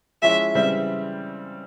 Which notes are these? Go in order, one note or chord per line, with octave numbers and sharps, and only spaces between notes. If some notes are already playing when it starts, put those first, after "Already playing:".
F3 G#3 C#4 E4 E5
C#3 E3 G3 C4 E5